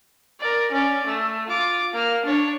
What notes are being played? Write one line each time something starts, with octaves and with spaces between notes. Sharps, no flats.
A#4 D5
C#4 D5
A3
F4 D6
A#3 F6
D4 C#5